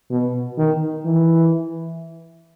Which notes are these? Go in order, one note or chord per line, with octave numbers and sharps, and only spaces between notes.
B2
D#3
E3